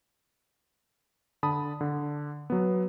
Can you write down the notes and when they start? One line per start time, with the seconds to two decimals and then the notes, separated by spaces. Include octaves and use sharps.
1.43 D3 A5 B5 D#6
1.81 D3
2.50 F#3 B3